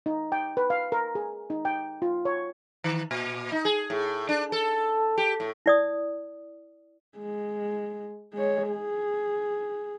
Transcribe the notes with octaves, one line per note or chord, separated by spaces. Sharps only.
D#4
G5
B4
F5
A#4
G#4
D#4
G5
F4
C#5
D#3
A#2
D#4
G#4
A2
D4
A4
G4
A2
E4 D5 D#6
G#3
G#3 C#5
G#4